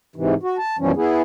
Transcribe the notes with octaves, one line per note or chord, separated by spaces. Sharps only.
G#2 C3 E3
F#4
A5
F#2 B2 E3 F3 G3 C#4
B3 E4 G#4